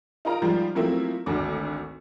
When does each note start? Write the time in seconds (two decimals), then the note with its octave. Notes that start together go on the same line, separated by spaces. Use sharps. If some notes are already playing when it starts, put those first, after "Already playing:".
0.25 D#4 F4 A#4 A#5
0.42 G#2 F3 G3
0.75 F3 F#3 A3 A#3 C4 E4
1.26 G#1 D2 D3 F#4 D6